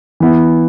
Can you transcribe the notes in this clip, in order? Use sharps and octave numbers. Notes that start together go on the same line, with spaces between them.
E3 B3 E4